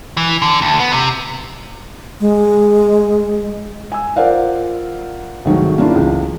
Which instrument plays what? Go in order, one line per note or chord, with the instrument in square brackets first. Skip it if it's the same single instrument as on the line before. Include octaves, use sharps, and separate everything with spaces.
[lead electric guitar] E3
D3
D2
B3
C3
[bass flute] G#3
[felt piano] G#5 E6
F4 A#4 C5 D5 F5 F#5
C2 G#2 D#3 F#3 A3
A#3 C#4 D4 E4 F4
C#2 E3